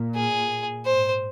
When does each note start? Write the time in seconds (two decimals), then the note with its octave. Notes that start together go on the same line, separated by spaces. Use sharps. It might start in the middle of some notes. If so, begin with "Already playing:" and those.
Already playing: A#2
0.15 G#4
0.86 G#2 C5